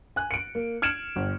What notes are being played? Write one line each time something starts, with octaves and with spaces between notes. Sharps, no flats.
G#5 F#6
C#7 D7
A#3
F6 G#6 C#7 D7 E7 F#7
G1